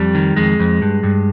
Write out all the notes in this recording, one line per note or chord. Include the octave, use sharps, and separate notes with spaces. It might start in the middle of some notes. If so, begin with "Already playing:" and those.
Already playing: F2 G3
D#3
F2 G#3
F2
G2
G2